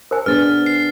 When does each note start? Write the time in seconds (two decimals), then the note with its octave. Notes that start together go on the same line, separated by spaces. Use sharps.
0.11 A#4 C5 G#5
0.26 B3 D4 G#4 B4 F6 A6
0.66 C7